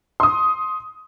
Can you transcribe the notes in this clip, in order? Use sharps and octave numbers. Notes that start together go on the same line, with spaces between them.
C6 D#6